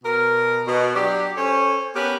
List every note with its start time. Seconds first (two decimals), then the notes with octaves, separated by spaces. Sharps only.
0.04 B2 A#4
0.66 B2
0.96 F#3 D4 G4
1.37 C#4 A4 C5 C#5
1.95 B3 C#4 G4 A#4 B4